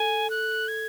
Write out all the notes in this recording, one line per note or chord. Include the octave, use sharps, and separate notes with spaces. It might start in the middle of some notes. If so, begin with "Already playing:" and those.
Already playing: A4 G#5
F#6
G#6